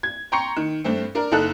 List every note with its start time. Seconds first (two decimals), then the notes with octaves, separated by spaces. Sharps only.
0.03 G#6
0.32 G5 A#5 C6 C#6 C#7
0.57 D#3
0.84 G2 A3 C4
1.15 D4 A#4
1.32 F#1 D#4 A4 F#6